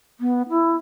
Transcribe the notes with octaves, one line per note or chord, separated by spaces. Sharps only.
B3
E4